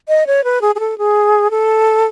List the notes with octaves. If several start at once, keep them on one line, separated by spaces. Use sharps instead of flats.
D#5
C#5
B4
G#4
G#4
A4
G#4
A4